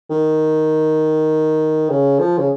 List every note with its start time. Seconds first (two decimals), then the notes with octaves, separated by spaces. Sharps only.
0.10 D#3
1.90 C#3
2.20 F3
2.38 C#3